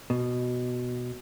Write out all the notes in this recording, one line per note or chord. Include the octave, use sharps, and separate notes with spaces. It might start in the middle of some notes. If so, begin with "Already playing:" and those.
B2